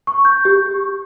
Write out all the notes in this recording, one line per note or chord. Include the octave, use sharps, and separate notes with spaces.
C#6
G6
G4